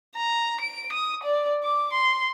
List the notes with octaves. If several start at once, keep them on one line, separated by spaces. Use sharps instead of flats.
A#5
D7
D#6
D5
D6
C6